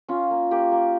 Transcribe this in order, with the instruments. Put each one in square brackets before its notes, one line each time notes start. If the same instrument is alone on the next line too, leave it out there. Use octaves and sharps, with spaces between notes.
[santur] C#4 F4
A#3
A#3 G4
A#3